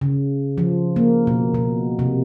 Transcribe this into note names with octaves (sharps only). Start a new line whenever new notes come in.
C#3
F3
A#3
B2
B2
C3